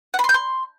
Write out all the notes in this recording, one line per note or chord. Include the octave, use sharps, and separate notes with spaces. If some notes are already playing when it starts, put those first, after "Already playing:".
F#5
B5
C6
G6
C6